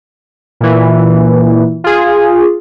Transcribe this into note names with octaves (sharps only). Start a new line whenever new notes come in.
A#2 E3
F4 G#4